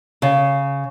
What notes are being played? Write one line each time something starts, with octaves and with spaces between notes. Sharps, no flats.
C#3